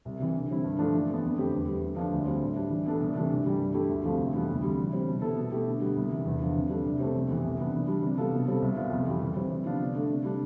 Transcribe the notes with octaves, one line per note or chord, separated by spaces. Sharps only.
C2
C3 E3
D3
G3 C4 E4
G2
F3 A3 D4 F4
E3
D4
B3
F2
D3 A3 C4 G4
E2
D3 G3
D3
F3 A3 D4
D2
D3 G3 C4
A2
G3 D4
E3
B3 D4 A4
C2
C3 E3 A3 D4
G2
E3 G3 D4 G4
G2
D3 A3 E4 G4
D2
C3 F3 A3
F2
E3 G3 B3
D2
C3 G3
E3
G3 C4
B2
B3 E4 A4
B2
A3 E4 G4
D3
G3 B3
C2
C3 E3
E2
D3 F3
C3
G3 D4 A4
C2
B2 A3 C4 G4
F2
E3 B3
C2
C3 G3 B3 D4
E3
G3 D4
C3
G3 B3 F4 A4
B2
G3 C4 F4 A4
C2
B2 B3 F4
F2
E3 G3
E3
G3 C4 E4
C3
F3 B3 D4 F4
D3
A3 D4
C3
G3 D4